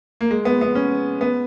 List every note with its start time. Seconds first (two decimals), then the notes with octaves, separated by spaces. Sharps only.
0.21 A#3
0.31 G#3
0.45 B3
0.61 B3
0.75 C#4
1.21 B3